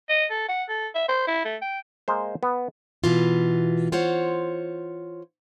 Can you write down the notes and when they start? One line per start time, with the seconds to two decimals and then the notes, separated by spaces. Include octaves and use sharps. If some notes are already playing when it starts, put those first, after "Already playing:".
0.09 D#5
0.30 A4
0.48 F#5
0.69 A4
0.95 E5
1.08 C5
1.27 E4
1.45 A3
1.62 G5
2.08 G#3 A#3 C5
2.43 B3
3.04 B2 E3 F4
3.92 F4 C5 C#5 F#5